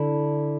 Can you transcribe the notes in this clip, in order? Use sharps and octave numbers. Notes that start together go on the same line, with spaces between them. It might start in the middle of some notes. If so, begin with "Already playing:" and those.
Already playing: D3 E4